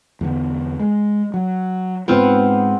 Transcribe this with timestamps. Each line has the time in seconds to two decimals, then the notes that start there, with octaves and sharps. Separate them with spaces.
0.21 E2 D3 B3
0.80 G#3
1.34 F#3
2.08 G#2 G#3 B3 C4 F4